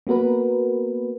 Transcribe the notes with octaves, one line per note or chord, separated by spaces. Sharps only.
A#3 B3 F#4 A#4 B4